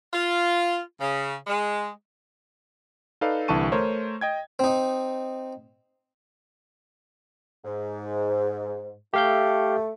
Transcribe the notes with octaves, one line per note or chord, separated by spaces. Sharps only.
F4
C#3
G#3
D#4 A4 B4 D5 F5
C2 D3 E3 A5 C#6 D#7
A3 A#4 C5 C#5
D#5 G5 G#6
C4 D#4
G#2
A3 G4 F5 G6